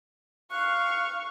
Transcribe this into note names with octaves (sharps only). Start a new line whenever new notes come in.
F5 C#6 F#6